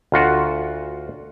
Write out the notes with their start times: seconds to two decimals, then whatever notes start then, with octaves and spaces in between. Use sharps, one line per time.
0.12 D2 F4 F#4 F#5